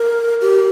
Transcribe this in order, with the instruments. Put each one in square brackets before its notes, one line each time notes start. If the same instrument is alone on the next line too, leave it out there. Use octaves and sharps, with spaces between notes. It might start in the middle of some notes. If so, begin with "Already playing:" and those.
Already playing: [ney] A#4
G4